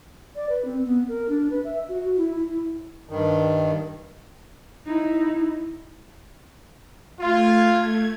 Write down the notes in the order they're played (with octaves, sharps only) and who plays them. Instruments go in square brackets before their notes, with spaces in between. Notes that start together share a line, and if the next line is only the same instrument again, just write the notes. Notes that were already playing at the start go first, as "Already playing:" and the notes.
[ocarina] D5
B4
C4
B3
A#4
D4
B4
E5
F#4
E4
E4
[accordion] G2 D#3
[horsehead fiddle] D#4 E4
[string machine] A3 G#6 [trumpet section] F4